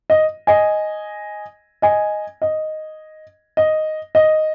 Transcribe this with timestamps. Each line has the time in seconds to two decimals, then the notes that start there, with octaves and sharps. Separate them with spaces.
0.10 D#5
0.47 D#5 G#5
1.82 D#5 G#5
2.42 D#5
3.57 D#5
4.15 D#5